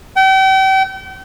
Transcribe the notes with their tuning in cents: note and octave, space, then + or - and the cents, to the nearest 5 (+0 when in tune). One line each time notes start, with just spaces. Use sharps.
G5 -40